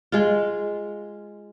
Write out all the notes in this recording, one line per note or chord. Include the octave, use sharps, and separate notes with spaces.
G#3 F4